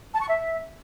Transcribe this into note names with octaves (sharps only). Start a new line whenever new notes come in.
A5
C#6
E5